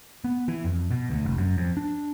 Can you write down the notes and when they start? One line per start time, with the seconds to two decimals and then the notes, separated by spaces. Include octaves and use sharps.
0.24 B3
0.48 E3
0.65 F2
0.91 B2
1.11 D2
1.25 F1
1.38 F#2
1.58 F2
1.77 D4